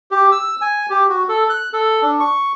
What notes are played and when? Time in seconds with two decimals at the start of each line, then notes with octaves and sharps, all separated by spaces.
0.11 G4
0.32 E6
0.61 G#5
0.90 G4
1.09 F#4
1.29 A4
1.50 F#6
1.73 A4
2.02 D4
2.20 C#6